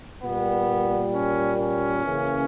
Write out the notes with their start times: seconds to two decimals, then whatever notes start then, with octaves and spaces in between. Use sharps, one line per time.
0.22 A#2 G3 A#3 B3
1.14 C#4
1.60 C#4
2.05 C#3 E3 A#3